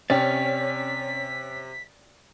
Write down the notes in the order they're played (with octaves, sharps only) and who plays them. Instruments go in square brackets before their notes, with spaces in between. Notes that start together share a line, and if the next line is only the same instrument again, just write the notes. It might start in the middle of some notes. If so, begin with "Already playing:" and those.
[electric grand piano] C3 [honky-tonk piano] C#4 [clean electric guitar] D5 G5 [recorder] B6